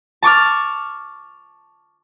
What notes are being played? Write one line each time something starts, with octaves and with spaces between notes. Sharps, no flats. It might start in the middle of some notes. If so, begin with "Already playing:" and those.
A5 C#6 D6 F6